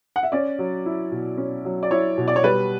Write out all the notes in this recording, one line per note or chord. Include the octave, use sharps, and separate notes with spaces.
F#5
E5
C#4 D5
F#3
E4
B2
C#4
F#3
D5
E4 C#5
B2
D5
C#5
G3 B4